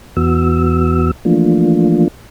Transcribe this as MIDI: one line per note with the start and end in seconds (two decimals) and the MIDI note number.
0.17 1.11 40
0.17 1.11 52
0.17 1.11 59
0.17 1.11 66
0.17 1.11 88
1.25 2.08 52
1.25 2.08 53
1.25 2.08 57
1.25 2.08 58
1.25 2.08 62
1.25 2.08 65